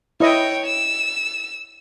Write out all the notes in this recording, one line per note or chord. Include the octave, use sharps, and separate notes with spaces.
E4 C#5 D#5 G5
E6